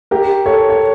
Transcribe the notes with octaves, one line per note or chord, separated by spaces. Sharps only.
G4 A#4
A4 C#5
C#5